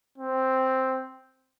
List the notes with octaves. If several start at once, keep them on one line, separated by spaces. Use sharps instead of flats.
C4